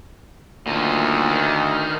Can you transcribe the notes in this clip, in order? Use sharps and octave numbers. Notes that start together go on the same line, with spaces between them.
D2 A#2 D#3
D#3